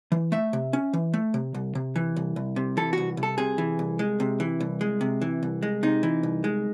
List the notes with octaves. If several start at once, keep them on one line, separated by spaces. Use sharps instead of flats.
E3
A3 E5
C3
C#4
E3
A3
C3
C2
C3
E3
C2
C2
C3
E3 A4
C2 F#4
C2
A4
C3 G#4
E3
C2
G#3
C3
E3
C2
G#3
C3
E3
C2
G#3
C3 D#4
E3
C2
G#3